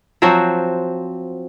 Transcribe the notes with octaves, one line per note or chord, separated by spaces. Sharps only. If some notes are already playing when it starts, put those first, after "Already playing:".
F3 F#3 C4 F#4